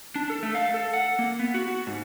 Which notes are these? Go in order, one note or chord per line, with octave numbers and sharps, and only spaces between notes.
D4
A4
A3
F5
A4
F#5
A#3
B3
F#4
F#4
G#2